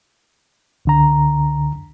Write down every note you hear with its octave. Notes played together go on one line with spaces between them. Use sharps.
C#2 D3 A#5